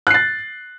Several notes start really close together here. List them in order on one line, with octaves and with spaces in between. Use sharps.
F#6 C7 A6